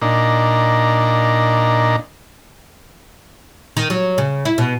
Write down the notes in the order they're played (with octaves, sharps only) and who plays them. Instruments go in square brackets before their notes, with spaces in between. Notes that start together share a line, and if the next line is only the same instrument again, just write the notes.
[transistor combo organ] A#2 D4 D#4 A#5
[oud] D#3
F#3
C#3
E4
B2